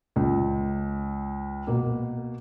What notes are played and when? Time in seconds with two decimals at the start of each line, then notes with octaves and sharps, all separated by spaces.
0.16 C#2
1.67 B2 A#3